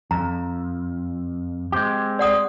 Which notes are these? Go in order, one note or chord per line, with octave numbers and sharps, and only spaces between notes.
F2 A#5
G#3 C4 G4
D5 F#5 D#6